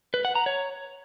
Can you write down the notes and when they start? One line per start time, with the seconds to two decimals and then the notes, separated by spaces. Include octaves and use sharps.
0.14 B4
0.25 F#5
0.35 A#5
0.46 C#5